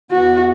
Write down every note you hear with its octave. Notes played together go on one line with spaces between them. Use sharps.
E2 E3 B3 F#4